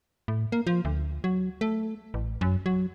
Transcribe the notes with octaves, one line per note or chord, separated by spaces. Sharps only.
A2
A#3
F3
D2
F#3
A3
A1
F#2
F#3